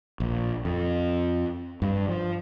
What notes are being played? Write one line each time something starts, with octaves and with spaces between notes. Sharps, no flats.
A#1
F2
G2
F3